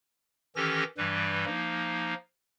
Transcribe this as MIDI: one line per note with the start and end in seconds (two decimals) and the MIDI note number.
0.56 0.84 51
0.56 0.84 52
0.56 0.84 61
0.56 0.84 67
0.56 0.84 69
0.56 0.84 94
0.98 1.45 43
0.98 1.45 52
0.98 1.45 55
0.98 1.45 71
1.46 2.14 53
1.46 2.14 58
1.46 2.14 63